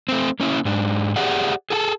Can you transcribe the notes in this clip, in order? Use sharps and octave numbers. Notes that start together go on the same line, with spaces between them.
A3 C4
A#3 C#4 E4
G#2 D4
G4 G#4 C5 D5 E5 F#5
G#4 A4 G5 A5